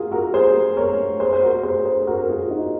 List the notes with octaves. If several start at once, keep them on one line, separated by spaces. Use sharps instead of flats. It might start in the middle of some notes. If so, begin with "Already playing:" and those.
Already playing: F4 F#4 G#4 A#4
F#4 A#4
G#4 C5
A#4 C#5
G#4 C5
C5
F#4 A#4
G#4 C5
G#4 C5
F#4 A#4
A#4
F4 G#4
D#4 F#4